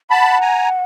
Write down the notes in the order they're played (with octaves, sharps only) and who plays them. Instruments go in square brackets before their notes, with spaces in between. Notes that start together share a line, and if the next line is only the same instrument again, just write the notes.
[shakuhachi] F#5 [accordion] A5 B5
[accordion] G#5 A#5